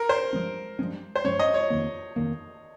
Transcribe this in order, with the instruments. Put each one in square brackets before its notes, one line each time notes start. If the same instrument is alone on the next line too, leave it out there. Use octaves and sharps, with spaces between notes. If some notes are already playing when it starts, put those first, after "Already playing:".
Already playing: [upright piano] A#4
C5
[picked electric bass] G2 F3 G#3 C#4
G2 F3 G#3 C#4
[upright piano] C5
[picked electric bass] G2 F3 G#3 C#4 [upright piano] C#5
[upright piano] D#5
C#5
[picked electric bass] F2 D#3 A#3
F2 D#3 A#3